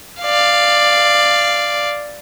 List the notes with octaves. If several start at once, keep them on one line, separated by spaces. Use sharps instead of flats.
D5 F5